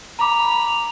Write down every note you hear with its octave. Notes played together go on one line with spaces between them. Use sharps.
A#5 B5 D6 F7